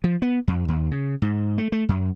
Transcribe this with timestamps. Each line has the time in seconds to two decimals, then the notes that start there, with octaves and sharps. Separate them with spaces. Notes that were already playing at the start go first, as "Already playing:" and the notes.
0.04 F3
0.22 B3
0.48 F2
0.68 D#2
0.91 C#3
1.22 G#2
1.58 A3
1.72 A3
1.89 F#2